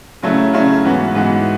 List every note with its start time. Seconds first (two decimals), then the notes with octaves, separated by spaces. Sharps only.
0.22 C#3 F#3 A3 C#4 E4
0.53 C#3 F#3 A3 C#4 E4
0.84 G#2 E3 B3 F#4
1.15 G#2 E3 B3 F#4